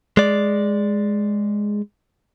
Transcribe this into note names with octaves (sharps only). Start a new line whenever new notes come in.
G#3 D5